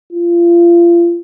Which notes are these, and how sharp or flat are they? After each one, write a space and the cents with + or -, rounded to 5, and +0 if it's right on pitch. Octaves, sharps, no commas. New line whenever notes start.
F4 -30